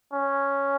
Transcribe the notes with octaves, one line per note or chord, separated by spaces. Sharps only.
C#4